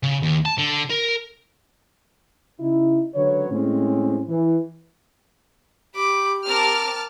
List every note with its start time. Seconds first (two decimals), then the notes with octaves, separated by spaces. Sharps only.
0.03 C#3
0.22 D#2
0.45 A5
0.58 D3
0.90 A#4
2.59 C#3 D#4 E4
3.14 C#2 D3 F#3 B4 C#5
3.51 A2 G#3 C4 C#4
4.27 E3
5.95 G4 B5 D6
6.46 C4 A#4 A5 D6 F6